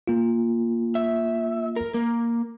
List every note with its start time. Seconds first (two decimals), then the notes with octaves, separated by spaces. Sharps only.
0.07 A#3 F4
0.95 E5
1.76 A#4
1.94 A#3